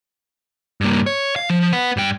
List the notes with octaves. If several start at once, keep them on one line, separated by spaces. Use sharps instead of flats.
G2 A#3
C#5
F5
F3
B4 F#5
G2 G5